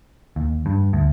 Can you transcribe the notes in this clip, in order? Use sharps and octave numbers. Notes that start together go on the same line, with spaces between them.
D#2
G2
D2